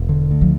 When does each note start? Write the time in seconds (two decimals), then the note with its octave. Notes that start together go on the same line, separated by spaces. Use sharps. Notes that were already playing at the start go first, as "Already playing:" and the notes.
Already playing: E1
0.09 D3
0.31 D2
0.41 F3